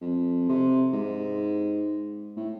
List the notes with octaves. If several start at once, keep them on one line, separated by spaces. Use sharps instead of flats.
F2
C3
G#2
A2